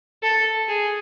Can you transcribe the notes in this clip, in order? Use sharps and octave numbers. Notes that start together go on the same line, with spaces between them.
A4
G#4